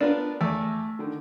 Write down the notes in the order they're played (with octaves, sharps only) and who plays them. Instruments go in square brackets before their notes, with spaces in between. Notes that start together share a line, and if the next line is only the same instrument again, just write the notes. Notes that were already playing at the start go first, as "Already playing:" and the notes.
[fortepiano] B3 F4 A#4 [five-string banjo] D4
[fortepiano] E2 [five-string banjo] A3
[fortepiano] D3 D#3